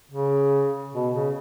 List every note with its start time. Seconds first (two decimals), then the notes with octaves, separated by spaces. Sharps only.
0.11 C#3
0.94 B2
1.15 C#3